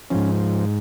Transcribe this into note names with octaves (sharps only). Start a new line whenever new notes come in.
G#2 F3 C#4